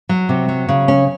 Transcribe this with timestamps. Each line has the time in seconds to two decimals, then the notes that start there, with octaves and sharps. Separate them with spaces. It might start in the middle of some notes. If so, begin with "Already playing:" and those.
0.09 F#3
0.29 C3
0.49 F#3
0.68 C#3
0.88 C#4